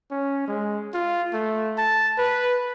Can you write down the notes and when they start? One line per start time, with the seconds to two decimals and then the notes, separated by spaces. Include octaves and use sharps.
0.11 C#4
0.48 G#3
0.94 F4
1.33 A3
1.78 A5
2.18 B4